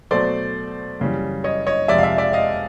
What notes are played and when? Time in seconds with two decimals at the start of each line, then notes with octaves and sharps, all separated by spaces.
0.11 B2 F#3 A3 C5 D5
1.00 F#2 C#3 E3 G3
1.44 C#5 D#5
1.67 C#5 D#5
1.88 F2 C3 F3 G#3 D5 E5
1.98 F5
2.03 D5 E5
2.18 D5 E5
2.33 D#5 F5